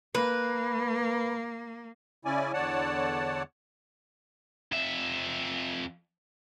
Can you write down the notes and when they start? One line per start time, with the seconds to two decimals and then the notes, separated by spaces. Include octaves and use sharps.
0.15 A#3 B4
2.25 C#3 C#4 E4 D5 G#5
2.53 E2 D3 C#5 D5 F#5 A5
4.72 F2 E5